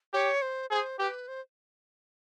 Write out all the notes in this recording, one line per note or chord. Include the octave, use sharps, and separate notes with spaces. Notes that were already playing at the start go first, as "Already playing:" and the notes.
G4 C#5
C5
G#4 C5
G4 B4
C5